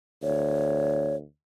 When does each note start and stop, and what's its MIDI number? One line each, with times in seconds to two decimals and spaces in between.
0.23 1.25 38
0.23 1.16 73